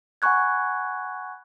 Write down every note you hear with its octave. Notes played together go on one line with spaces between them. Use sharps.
F#5 G#5 B5 C#6 F#6 G#6